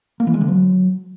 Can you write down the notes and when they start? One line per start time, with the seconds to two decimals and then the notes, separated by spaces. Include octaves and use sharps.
0.20 A#3
0.27 E3
0.34 G#3
0.41 D3
0.48 F#3